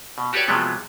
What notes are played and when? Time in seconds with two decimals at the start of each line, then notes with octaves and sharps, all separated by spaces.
0.18 B2
0.33 F#4 G4 A4 B4 C#5 D5
0.48 C3 F3 F#3 G#3 A3 B3